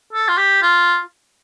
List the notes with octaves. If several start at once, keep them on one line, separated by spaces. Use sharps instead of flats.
A4
F4
G4
F4